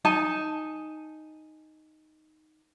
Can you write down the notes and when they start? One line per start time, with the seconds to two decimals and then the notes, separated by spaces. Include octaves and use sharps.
0.05 D#4 G#5 A5